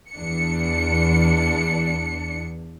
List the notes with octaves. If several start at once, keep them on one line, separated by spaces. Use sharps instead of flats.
E2 D4 C#7